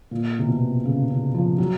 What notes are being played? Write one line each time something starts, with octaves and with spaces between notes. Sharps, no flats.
A#2
C3
B2
C#3
C#3
F3
F#3